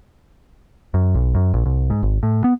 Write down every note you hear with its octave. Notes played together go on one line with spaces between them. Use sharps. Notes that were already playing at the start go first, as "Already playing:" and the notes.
F#2
B1
F#2
A#1
C2
G#2
G#1
A2
B3